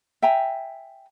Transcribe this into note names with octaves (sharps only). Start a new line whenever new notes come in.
E5 G5 G#5 A#5